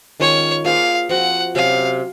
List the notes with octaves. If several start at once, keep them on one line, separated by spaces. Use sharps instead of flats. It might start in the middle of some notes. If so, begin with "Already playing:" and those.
D#3 G#3 C#4 F4 C#5
A#3 F4 G#4 C5 F5
F3 C4 F#4 F#5
C3 F#3 C#4 F5